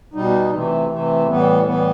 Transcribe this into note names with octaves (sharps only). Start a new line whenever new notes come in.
B2 G3 D#4
C3 E3 A3
C3 E3 A3
A2 E3 G3 B3
A2 E3 G3 B3